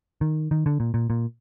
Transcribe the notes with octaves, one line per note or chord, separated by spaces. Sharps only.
D#3
D#3
D3
A#2
A#2
A#2